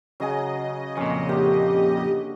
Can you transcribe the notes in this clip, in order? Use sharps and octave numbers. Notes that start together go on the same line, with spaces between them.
C#3 F#3 G#4 D#5
F2 A#2 C#4
D3 A#3 G4